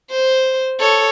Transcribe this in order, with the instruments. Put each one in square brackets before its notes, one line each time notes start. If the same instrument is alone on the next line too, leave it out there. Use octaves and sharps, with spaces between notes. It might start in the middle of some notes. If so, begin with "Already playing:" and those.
[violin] C5
A4 C#5